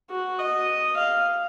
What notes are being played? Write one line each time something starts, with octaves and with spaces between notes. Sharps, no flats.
F#4
D#5
F5